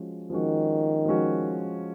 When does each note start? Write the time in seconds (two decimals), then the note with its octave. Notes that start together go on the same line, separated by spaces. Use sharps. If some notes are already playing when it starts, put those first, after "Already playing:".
Already playing: F3 G#3 C#4 F#4
0.30 D#3 F3 G#3 C#4 F#4
1.05 F3 G#3 C#4 F#4